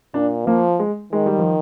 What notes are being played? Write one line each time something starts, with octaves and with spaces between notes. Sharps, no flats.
A#2 D4
F3 A#3
G#3
D#3 G#3
G3
F3